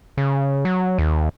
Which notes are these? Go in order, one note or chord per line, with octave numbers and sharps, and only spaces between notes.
C#3
F#3
D#2